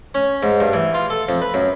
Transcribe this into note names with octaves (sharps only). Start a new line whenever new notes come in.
C#4
G#2
G2
E3
F4
A4
F2
B4
F#2